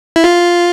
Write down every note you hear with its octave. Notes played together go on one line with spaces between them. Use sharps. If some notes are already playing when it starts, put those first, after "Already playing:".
E4
F4